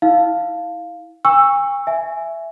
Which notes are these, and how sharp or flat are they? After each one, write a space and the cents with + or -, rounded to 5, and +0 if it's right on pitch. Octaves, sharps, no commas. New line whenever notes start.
E4 -25 F5 +0
G#5 -45 C#6 +0 E6 +10
E5 +10 G#5 +0